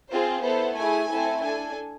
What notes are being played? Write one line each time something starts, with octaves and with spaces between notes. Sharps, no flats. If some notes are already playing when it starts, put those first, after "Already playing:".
C4 F4 G#4 C5
B3 E4 A4 C5
A3 E4 G#4 G#5
A3 C4 E4 A4
D4 A4 G#5